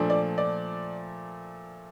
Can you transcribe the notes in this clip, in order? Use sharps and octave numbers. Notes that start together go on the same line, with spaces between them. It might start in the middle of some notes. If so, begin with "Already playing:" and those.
Already playing: A#2 F3 A3 D4
D5
D5